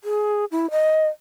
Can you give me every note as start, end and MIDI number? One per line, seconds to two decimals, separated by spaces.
0.04 0.45 68
0.52 0.70 64
0.71 1.08 75